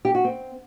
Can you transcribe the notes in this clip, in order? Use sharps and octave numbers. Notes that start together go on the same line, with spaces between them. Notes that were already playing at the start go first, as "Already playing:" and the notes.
G4
F#4
C4